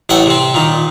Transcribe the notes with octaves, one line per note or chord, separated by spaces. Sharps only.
A1 A3 F#5 G5
C3 C4
A#2 D#3